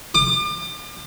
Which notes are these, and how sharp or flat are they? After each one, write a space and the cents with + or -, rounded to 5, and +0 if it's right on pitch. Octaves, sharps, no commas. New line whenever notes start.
D6 +40